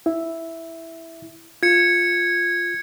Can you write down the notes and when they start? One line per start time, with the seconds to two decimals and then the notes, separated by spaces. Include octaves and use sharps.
0.06 E4 E5
1.63 F4 G#6 C#7